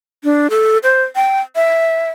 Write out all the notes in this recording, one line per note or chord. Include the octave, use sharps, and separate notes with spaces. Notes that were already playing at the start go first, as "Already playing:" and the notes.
D4
A4
C5
G5
E5